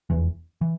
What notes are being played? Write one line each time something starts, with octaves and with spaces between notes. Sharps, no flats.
F1 E2 E3
E3